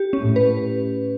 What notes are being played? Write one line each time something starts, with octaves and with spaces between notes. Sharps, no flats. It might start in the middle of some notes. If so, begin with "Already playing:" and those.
Already playing: G4
C#4
A2
B4